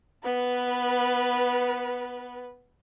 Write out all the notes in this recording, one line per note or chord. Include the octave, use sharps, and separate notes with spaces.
B3 B4